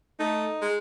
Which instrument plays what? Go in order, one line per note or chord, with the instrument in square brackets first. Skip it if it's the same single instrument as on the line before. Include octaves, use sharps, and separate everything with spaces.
[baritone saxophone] A3 [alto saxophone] D#4
[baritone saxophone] G#3